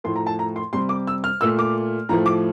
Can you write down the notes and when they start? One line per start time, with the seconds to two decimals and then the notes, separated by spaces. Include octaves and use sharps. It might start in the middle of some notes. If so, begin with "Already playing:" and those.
0.04 A2 F3 A3 C6
0.16 A#5
0.27 A5
0.39 A#5
0.56 C6
0.73 C3 G3 C6
0.89 D6
1.07 E6
1.24 F6
1.41 A#2 A3 E6
1.59 D6
2.09 A2 F3 A3 A#5
2.26 D6